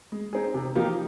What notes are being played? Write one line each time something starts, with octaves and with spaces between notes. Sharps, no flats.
G#3
C4 D#4 G#4
C3
F3 A#3 D#4 G4